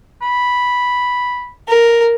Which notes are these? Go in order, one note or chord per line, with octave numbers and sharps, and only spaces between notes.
B5
A#4